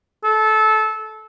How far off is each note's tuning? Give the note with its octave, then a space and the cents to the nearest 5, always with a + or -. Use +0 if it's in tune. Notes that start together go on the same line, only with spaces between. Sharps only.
A4 -20